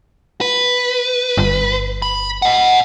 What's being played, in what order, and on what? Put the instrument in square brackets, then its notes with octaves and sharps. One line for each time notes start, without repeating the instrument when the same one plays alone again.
[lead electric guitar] B4
[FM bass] G1
[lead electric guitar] B5
D#5 F#5